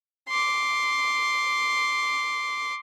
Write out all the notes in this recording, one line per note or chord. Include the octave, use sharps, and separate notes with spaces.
C6 D6